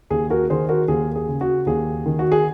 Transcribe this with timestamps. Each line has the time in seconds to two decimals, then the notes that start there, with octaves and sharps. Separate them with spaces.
0.10 D#2 G#4
0.30 F#4 A#4
0.50 D#3 G#4 C5
0.69 F#4 A#4
0.88 D#2 G#4
1.15 G#4
1.28 C#3
1.41 F#4
1.66 D#2 G#4
2.06 D#3
2.19 F#4
2.32 G#4